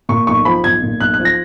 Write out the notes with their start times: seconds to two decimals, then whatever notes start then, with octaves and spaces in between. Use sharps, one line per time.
0.09 A#2 C#6
0.27 B1 C#6
0.45 F3 B5
0.64 B1 G#6
0.83 A#2
1.00 B1 F#6
1.14 F#6
1.19 F3
1.25 A#6